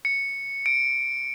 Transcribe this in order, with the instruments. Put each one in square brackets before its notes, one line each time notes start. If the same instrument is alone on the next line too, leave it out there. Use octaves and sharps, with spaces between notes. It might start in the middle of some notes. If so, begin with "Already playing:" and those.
[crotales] C#7
D7